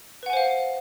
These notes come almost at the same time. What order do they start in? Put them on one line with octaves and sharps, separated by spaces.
B4 F#5 G#5 C5 F5